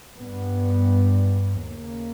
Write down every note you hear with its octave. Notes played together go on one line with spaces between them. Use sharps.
G2 B3
D#2 C#3 A#3